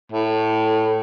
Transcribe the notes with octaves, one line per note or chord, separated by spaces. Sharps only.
A2